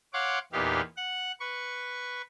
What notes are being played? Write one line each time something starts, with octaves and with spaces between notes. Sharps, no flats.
C#5 F5 F#5 C6 D6
E2 A#2 B3 D#4 G4 F5
F#5 F#6
B4 C#6